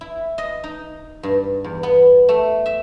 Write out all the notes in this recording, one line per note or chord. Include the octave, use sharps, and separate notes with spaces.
E4
D#5
D#4
G2
E2
B3
A3
E5